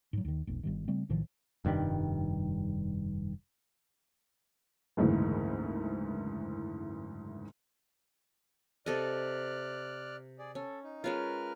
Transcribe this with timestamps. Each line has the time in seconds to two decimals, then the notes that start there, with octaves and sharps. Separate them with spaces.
0.13 G#2 F#3
0.25 D#2 D#3
0.47 F1 B1
0.63 G1 G2 D#3
0.88 C#3 G3 A3 C4
1.09 B1 A2 D#3 F3
1.65 F1 G2 D#3 G3
4.97 F#1 D2 G#2 E3
8.86 C3 A4 D5 D#5 F6 F#6
10.39 G#4 D5
10.55 C#4 A4
10.84 D#4
11.04 G#3 C#4 F4 A#4 B4 F6